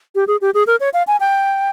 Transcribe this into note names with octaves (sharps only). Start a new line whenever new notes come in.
G4
G#4
G4
G#4
A#4
C#5
F5
G#5
G5